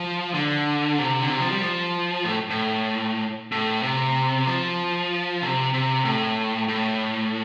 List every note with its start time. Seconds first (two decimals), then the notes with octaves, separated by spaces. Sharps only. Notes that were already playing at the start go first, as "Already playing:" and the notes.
Already playing: F3
0.34 D3
0.99 C3
1.21 D3
1.30 C3
1.40 F3
1.51 G3
1.62 F3
2.25 A2
2.50 A2
3.52 A2
3.83 C3
4.47 F3
5.42 C3
5.74 C3
6.05 A2
6.68 A2